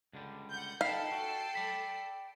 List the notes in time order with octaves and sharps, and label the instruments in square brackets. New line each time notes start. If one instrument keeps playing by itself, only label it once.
[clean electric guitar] C#2 D3 G3
[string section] F#5 G6
[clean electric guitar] D#4 F4 B5 [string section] A4 C7 [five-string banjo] F5 [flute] G5
[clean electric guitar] F#4
D5 B5